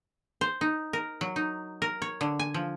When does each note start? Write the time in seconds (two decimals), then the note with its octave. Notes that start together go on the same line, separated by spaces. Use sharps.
0.41 C5
0.61 D#4
0.93 A#4
1.21 F#3
1.36 D#4
1.82 A#4
2.02 C#5
2.21 D3
2.39 G#5
2.54 F3